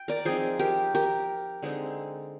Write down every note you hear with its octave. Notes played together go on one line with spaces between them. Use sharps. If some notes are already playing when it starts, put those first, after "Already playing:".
Already playing: G5
A#4 D5
F3 C4 D#4 G#4 C5
G4 A#4
G4 A#4
D3 G#3 C4 D#4